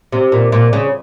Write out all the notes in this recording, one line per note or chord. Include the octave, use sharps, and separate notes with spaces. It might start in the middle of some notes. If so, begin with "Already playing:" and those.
C3
A#2
A#2
C#3